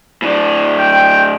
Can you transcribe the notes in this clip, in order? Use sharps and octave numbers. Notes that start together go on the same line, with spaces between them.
A2 D4
G5